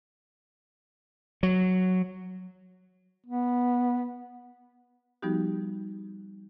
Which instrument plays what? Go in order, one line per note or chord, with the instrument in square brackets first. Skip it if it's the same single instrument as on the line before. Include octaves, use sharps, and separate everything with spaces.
[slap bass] F#3
[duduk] B3
[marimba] F3 G3 B3 D#4 F#4 G4